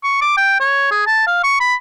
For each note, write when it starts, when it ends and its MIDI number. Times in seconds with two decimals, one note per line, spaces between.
0.04 0.19 85
0.22 0.33 86
0.37 0.59 79
0.60 0.88 73
0.91 1.03 68
1.06 1.24 81
1.27 1.39 77
1.44 1.57 85
1.60 1.75 83